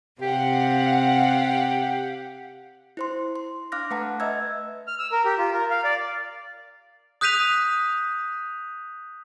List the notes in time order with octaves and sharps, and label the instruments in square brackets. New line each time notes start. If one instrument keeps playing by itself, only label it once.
[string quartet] C3 [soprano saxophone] G4 [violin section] F5 F#5
[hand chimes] E4 C5 C6
C6
D4 F5 D6 F6 F#6 A#6
A3 B4 F5 F#5 A5 A#5
B4 D#5 E5 E6 G#6
[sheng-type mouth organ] F6
E6
A#4
G4
F4
A#4
F5
D5
[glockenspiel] D#6 F#6 G6 B6 D#7 F7